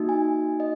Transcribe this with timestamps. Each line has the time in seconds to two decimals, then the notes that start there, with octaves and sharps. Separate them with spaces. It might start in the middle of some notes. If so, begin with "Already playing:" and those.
Already playing: A#3 D#4 F#4
0.09 G#5
0.60 D#5